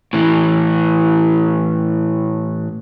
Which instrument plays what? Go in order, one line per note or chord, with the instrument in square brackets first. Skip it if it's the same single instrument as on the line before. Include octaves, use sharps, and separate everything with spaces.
[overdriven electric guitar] A2 E3